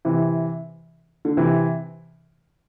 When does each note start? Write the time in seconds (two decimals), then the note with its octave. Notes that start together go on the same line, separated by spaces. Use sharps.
0.05 C3 E3
1.25 D3
1.37 C3 E3